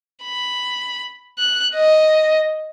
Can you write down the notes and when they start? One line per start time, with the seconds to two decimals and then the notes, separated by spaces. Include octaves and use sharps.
0.24 B5
1.38 F#6
1.75 D#5